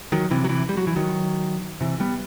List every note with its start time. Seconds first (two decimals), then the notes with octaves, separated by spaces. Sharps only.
0.12 D#3 F#3
0.31 C3 E3
0.44 F#3
0.49 C3 E3
0.69 G3
0.77 F#3
0.87 E3
0.96 D#3 F#3
1.81 C3 E3
2.00 G3 B3